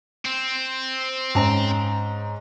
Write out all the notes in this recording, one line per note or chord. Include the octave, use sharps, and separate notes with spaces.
C4
G#2 C#4 A#5